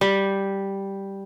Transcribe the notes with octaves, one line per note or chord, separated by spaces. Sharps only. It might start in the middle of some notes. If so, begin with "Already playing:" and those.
G3